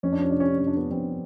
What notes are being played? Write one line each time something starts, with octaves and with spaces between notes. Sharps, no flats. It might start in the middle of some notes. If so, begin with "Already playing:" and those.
F2 C#4
D4
C#4
C3 D4
C#4
D4
F2 C#4
D4
B3 C#4
F2 C4 D4